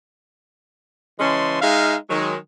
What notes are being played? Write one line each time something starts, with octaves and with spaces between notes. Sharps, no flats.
C#3 E3 G#3 C#4 A5 C6
G#3 D#4 E5 F5
D#3 F#3 G#3